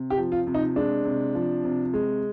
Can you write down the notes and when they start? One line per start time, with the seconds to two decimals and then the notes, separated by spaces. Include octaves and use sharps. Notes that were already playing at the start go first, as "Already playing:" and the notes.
Already playing: C3
0.10 G4
0.17 F3
0.32 F4
0.47 C3
0.54 D#4
0.76 G#3 D4
1.05 C3
1.35 F3
1.64 C3
1.94 G#3